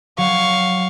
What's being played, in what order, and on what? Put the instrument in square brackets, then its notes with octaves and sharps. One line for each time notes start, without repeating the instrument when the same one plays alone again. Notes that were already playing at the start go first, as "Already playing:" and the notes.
[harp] F#3 [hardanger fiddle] F5 C#6